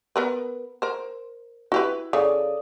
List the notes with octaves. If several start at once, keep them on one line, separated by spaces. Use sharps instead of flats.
B3 A#4 B4
A#4 C5
E4 F#4 G4 B4
C#3 A4 D5 D#6